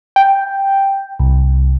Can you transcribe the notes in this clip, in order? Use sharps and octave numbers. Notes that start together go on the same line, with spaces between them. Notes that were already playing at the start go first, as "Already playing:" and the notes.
G5
C2